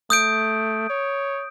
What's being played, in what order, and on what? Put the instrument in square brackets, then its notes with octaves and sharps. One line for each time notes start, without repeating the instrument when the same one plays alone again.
[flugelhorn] A3 [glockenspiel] D#6 G6 D7
[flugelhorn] C#5